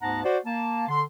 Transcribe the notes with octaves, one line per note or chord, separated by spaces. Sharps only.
D2 G#2 B3 F#5 A5 A#5
F#4 C5 D5
A#3 A5
D3 C6